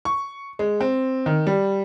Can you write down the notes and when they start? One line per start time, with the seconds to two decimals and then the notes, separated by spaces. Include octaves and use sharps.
0.05 C#6
0.59 G#3
0.81 C4
1.26 D#3
1.47 G3